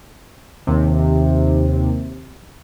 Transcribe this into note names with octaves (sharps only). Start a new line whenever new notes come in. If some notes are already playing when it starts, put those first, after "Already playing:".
D#2 C3